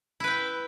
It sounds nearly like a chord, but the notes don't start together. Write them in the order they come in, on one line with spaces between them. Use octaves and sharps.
E4 B4 G5